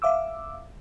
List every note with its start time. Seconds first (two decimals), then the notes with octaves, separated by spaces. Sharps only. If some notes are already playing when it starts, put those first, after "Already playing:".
0.02 E5 F5 D6 E6